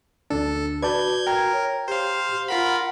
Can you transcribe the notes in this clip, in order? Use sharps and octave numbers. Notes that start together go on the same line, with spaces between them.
D2 D4 A4
F#4 B4 D5 A5 G6 G#6
A#4 G5 A#5 G#6
C#5
G4 C5 F5
F4 A#4 F#5 B5